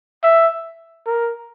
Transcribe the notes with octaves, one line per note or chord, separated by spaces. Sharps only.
E5
A#4